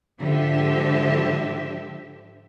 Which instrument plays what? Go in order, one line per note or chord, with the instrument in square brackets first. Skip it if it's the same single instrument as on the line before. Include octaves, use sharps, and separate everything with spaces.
[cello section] G#2 D3 F3 G4 E5